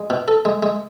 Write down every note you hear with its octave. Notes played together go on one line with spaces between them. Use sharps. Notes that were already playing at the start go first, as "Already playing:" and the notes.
Already playing: G#3
B2
A4
G#3
G#3